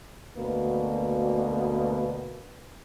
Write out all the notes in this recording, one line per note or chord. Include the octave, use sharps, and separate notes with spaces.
D2 B2 A#3 B4